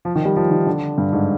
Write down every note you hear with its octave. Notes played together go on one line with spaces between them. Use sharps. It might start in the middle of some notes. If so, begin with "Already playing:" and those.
F3
D#3
G3
F3
D#3
D3
G2
G#2